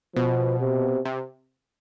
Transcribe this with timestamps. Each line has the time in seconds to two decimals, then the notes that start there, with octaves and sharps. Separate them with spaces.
0.15 B2 F3
0.60 C3
1.05 C3